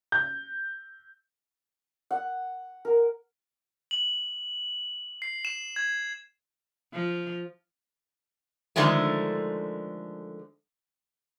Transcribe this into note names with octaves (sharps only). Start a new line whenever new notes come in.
G6
F#5
A#4
F#7
C7
E7
G#6
F3
D3 D#3 F3 G#3 A3